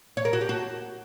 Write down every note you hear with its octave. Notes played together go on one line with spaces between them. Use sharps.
C#5
A#4
F#4
G4
F#4